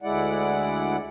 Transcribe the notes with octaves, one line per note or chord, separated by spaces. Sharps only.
D2 G#3 E4 D5 F#5